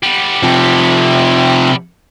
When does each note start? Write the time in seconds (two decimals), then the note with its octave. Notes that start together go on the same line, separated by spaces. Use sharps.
0.03 G3 B3
0.43 C3 F3